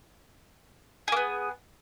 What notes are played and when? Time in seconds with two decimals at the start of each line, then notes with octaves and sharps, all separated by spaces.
1.08 G#4
1.12 A#3
1.17 B3